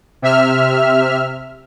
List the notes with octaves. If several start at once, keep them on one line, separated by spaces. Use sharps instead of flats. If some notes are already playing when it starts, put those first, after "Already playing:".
C3 E5 F6